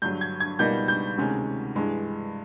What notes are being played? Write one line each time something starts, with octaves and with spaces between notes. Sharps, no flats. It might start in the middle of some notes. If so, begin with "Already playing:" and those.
G2 D3 F#3 G6
G#6
G#6
C#2 B2 G3 A#3 D#4 G6
G6
D2 C3 D#3 G#3 C#4
G2 E3 G#3